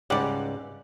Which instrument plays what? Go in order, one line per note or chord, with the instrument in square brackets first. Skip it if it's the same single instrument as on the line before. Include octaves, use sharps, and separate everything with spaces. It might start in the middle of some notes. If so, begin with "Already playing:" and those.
[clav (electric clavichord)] C#2 G#2 F#5 [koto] G3 D5